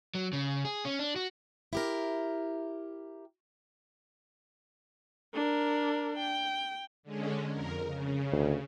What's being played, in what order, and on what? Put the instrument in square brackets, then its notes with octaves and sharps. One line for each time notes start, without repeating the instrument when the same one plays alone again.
[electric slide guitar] F#3
C#3
G#4
C#4
D4
F#4
[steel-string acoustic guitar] E4 G4 A#4
[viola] D4 A#4
G5
[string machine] D3 G#3 C#4
F2 A#4
C#3
[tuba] D2